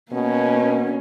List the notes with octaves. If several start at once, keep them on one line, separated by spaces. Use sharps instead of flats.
B2 A#3 C#4